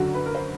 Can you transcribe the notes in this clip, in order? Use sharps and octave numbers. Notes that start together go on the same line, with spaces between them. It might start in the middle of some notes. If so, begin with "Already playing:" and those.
Already playing: F#2 D3 F#3 F#4
B4
A#4
C5